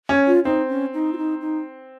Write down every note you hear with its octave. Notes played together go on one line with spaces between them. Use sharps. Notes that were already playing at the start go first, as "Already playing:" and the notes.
C#4
F4
C4 D#4
C#4
D#4
F4
D#4
D#4